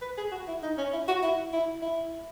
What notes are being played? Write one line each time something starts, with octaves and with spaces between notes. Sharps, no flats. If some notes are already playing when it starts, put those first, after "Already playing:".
B4
G#4
F#4
E4
D#4
C#4
E4
F#4
E4
E4
E4